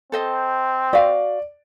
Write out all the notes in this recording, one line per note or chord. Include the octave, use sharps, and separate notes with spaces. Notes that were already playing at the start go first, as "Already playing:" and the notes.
C4 A4 C5 D#5
F#4 D5 F5